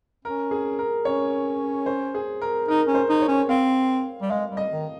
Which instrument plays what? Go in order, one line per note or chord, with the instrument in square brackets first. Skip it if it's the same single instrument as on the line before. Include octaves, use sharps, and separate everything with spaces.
[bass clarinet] C#4 [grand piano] A#4
[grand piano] G#4
A#4
[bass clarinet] C#4 [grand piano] C#5
[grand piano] C5
G#4
A#4
[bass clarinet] D#4 [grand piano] A#4
[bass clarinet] C#4
[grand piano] C5
[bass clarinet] D#4
[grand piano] C#5
[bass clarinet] C#4
[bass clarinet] C4 [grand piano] F5
[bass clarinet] G3
[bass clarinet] G#3 [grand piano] F5
[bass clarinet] G3
[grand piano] D#5
[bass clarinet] D#3